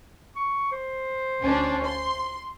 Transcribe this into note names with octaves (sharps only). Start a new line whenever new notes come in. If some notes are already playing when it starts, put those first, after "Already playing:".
C#6
C5
D2 C#4 D4
C6